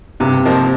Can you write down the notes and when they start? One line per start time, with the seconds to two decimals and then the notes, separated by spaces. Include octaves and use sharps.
0.20 G2 C3
0.45 F3 A#3 D#4